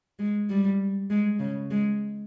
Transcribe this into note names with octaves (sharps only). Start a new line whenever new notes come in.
G#3
G3
G#3
C#3
G#3